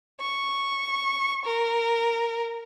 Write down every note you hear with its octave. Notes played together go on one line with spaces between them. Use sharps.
C#6
A#4